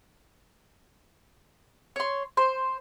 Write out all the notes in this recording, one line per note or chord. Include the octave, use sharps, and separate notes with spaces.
C#5 C6
C5